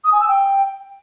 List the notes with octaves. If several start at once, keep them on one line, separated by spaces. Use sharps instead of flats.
D#6
G#5
E6
G5